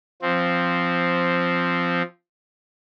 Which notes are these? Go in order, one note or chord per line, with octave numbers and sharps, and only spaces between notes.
F3 C4